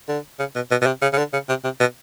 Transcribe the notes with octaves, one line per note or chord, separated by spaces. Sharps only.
D3
C#3
B2
B2
B2
C3
C#3
C#3
D3
C#3
C3
C3
B2